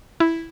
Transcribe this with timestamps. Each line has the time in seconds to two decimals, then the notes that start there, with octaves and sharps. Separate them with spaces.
0.20 E4